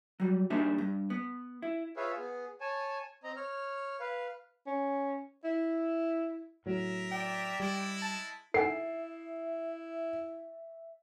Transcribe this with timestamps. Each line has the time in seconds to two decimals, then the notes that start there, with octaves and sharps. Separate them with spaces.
0.20 F#3 G3
0.50 G3 A#3 D4 D#4 C5 E5
0.78 G2
1.10 B3
1.62 E4
1.97 F4 G#4 B4 C#5 E5 F5
2.18 B3 G#4
2.61 C#5 G#5 A5
3.24 C4 D#5 A#5
3.36 C#5 F6
4.00 B4 F5
4.67 C#4
5.44 E4
6.66 A2 F#3 A#4 E5
7.12 D5 G5
7.60 G3 G#3 E4
8.02 A5
8.54 E4 A4 E5 F#5 G#5 C7